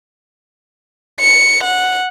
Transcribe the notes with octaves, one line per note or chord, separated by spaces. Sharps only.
C#7
F#5